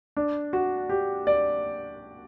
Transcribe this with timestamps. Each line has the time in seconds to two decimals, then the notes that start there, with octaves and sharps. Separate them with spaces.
0.17 D4
0.53 F#4
0.89 G4
1.27 D5